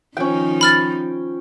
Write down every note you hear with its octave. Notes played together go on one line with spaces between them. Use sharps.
D#3 F3 C#4 D#4 F4 C5 G5
B5 F6 A6